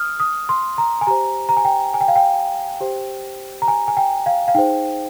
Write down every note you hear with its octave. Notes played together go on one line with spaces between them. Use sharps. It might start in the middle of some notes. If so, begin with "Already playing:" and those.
Already playing: D#6 F6
D#6
C6
A#5
G#5
G4 C5 A#5
A#5
G#5
G5
G#5
G5
F5
G5
G4 C5
A#5
G#5
G#5
G5
F5
F5
D#4 G#4 C5 G5